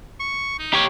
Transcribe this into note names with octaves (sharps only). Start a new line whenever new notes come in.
C#6
D#4
G4 C#5